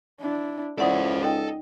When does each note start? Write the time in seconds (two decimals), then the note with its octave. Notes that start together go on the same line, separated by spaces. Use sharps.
0.20 D4 E4
0.78 C#2 E4 A4 C5 D5 F#5 D#6
1.23 D#4 A4 D#5 G5